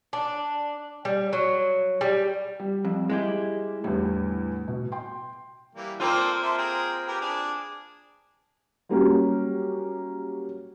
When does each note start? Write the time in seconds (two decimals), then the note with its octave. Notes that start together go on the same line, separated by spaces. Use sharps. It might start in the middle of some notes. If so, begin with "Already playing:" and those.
0.13 D4
1.05 G3
1.33 F#3
2.01 G3
2.60 G3
2.85 F2
3.10 G#3 E4 G4
3.84 E2 A2 D3 G3
4.68 B2
4.92 G5 C6
5.75 E3 G3 A#3
6.00 A#3 C4 F4 A4 C5 D5
6.42 A4 E5 C6
6.58 G#4 G5 A#5
7.07 G4 A#4 B4
7.21 D4 G#4 D6
8.89 F#3 G3 A#3 C#4 F#4 G4